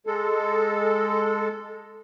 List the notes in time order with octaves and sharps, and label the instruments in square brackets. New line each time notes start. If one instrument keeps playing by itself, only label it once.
[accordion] G#3 A4